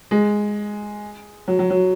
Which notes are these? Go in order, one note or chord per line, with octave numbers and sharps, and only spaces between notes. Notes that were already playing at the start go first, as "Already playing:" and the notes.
G#3
F#3
F#3
F#3